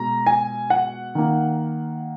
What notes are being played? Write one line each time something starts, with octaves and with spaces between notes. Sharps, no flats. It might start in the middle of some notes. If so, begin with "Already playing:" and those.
Already playing: B2 G#3 A#5
G#5
F#5
D#3 A#3